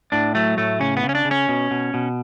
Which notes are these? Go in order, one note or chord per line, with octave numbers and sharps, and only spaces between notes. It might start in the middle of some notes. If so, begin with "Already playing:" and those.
A2 D4
F#3 A3
A2 A3
C#3 C#4
B3
C#3
C#4
D4
C#3
C#4
B2
B2
B2